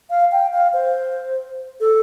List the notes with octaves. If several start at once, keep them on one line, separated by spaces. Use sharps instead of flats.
F5
G5
F5
C5
A4